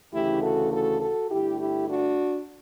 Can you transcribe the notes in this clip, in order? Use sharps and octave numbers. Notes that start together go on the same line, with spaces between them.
D2 C#3 E3 A3 E4 G4
F#4 A4
F#4 A4
F#4 A4
G2 D3 A3 E4 G4
E4 G4
D4 F#4